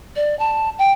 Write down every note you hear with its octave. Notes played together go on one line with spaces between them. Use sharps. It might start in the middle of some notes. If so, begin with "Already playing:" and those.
D5
A5
G5